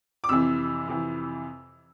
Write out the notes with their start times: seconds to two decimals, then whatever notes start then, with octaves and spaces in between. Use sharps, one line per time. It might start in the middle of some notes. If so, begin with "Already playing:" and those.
0.24 D6
0.29 F2 C3 E3 E6
0.87 F2 C3 E3